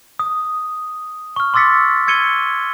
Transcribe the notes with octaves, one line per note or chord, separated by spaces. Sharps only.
D#6
C#6 F6
C6 D6 E6 A6 B6 C#7
E6 G#6 C#7 D#7 G7